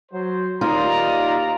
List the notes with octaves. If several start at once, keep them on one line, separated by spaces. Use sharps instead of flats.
F#3 C5
D#2 D#4 F4 D5 A#5